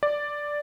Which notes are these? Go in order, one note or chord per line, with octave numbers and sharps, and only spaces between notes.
D5